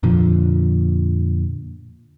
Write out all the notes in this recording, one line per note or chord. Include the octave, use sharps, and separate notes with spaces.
F2 A#2 D3 F3